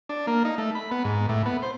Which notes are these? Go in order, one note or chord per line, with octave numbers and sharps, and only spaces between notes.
D4
A#3
D#4
A3
B5
B3
G#2
A2
B3
C5